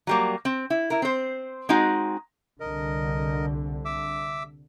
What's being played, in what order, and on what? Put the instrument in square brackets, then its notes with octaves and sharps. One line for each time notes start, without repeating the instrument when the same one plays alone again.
[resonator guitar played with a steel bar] F#3 G3 A#3
C4
E4
E4 A#4
C4 C5
G#3 C4 D#4 F#4
[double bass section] C2 D3 [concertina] A#4 D#5
[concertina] E5 D6 E6